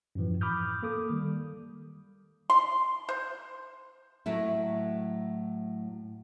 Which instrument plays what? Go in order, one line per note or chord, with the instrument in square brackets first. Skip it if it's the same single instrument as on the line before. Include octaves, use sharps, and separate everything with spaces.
[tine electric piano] F#2 A2 E3 F3
B5 D6 D#6 F6 G6
A#3 A4 D6 D#6
D#3 G3
[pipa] C6
C5
[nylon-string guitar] A2 F#3 A3 E4